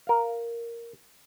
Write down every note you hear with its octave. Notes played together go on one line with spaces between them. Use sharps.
A#4 F5